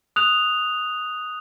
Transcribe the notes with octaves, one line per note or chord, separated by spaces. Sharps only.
D#6 F#6 F7